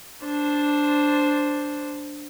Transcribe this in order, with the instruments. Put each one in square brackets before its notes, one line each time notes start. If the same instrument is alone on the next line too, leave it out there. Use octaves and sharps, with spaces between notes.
[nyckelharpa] D4 C5